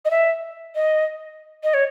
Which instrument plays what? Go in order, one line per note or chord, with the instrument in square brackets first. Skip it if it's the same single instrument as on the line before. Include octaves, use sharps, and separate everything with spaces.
[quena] D#5
E5
D#5
D#5
C#5